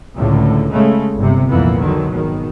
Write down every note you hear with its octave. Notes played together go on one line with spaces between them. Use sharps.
C#2 A2 D3
C#3 G#3 A3
G1 C3
C2 F2 A#2 E3 A#3 B3
D3 D#3 F#3
G#1 B2 D#3